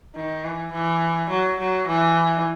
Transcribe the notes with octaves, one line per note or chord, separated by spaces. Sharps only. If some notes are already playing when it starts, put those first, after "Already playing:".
D#3
E3
E3
F#3
F#3
E3